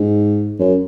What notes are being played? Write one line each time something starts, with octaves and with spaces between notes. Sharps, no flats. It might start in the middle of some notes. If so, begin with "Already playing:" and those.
Already playing: G#2
F#2